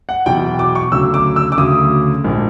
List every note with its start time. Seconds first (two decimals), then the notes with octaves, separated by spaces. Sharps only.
0.09 F#5
0.26 E2 B2 F#3 G5
0.59 D6
0.75 C#6
0.92 D2 C#3 F#3 E6
1.14 D6
1.36 E6
1.52 D6
1.58 D2 C#3 F#3 D#6
2.24 A#1 G#2 F3